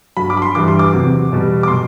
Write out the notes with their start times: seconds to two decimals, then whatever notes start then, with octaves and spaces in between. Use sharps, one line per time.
0.17 G2 F#3 B5
0.30 D6
0.37 B5
0.42 C6
0.55 G2 E3 G3 D6
0.68 C6
0.79 D6
0.93 E2 C3 F#3
1.30 E2 B2 G3
1.63 D6
1.68 B2 F#3 C6